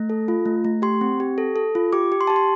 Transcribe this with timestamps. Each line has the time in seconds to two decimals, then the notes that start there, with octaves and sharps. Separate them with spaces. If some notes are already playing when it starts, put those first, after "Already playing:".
Already playing: A3
0.10 A4
0.28 F4
0.46 A3
0.65 A3
0.82 G4 C6
1.01 C4
1.20 G4
1.38 A4
1.56 A4
1.75 F4
1.93 G4 D6
2.12 G4
2.21 C6
2.27 G4 A5
2.36 C6